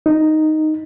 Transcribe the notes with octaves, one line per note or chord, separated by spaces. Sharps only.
D#4